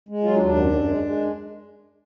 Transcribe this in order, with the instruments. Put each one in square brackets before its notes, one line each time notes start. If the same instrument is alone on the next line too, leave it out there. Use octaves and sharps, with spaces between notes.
[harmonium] G#3
F#3 F4
D4
D#2
D4
F#2
F#2
G#3
G#3